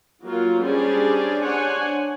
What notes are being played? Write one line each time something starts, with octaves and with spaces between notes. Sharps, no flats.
F#3 A#3 F4 A#4
G3 C#4 D4 G#4 C5 D5
D4 C5 C#5 F#5 G#5